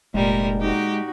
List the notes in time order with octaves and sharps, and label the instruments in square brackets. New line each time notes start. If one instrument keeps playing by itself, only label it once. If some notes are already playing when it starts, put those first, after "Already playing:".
[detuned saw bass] F1 [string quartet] A#2 G3 A#4 [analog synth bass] G#3
[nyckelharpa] D#4 F#4 [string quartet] G4